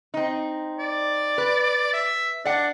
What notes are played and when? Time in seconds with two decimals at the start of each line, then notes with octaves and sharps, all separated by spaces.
0.14 C4 D#4
0.79 D5
1.38 B4
1.94 E5
2.45 D4 D5 F#5